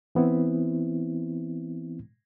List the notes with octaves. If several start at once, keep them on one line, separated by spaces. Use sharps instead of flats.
E3 B3 C4 E4